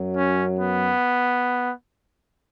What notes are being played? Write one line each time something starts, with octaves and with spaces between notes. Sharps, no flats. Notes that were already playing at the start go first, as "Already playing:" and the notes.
Already playing: F#2 F#3
C#4
B3